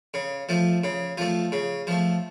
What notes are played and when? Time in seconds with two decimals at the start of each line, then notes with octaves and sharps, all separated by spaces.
0.14 C#3
0.49 F3 A3
0.84 C#3
1.18 F3 A3
1.52 C#3
1.87 F3 A3